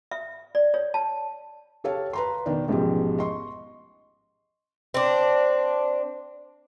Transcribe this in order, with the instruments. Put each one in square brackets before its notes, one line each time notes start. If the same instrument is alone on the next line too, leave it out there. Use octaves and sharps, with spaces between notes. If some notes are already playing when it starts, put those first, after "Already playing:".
[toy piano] E5
D5
C#5
A5
[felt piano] G4 A4 C#5 F5 A5
B4 A#5 C6
B2 D#3 D4
A1 G#2 B2 F3 G4
D#5 C6 C#6
[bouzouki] C4 D4